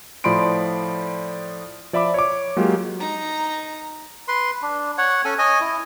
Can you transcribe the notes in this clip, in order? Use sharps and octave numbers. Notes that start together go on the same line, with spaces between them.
A2 F3 D5 B5 C6 D7
F3 D5 E5 B5 D6
C#5 D6
F#3 G#3 A#3 F4 G4
D#4 A#5
B4 C6
D4
C#5 F#5
C#4 A4 G#5
C#5 D#5 G#5
E4